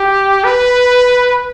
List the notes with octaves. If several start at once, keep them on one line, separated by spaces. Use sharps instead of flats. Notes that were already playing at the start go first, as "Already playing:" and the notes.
Already playing: G4
B4